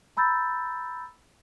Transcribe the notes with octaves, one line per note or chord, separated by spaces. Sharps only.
A#5 B5 E6 G6 A6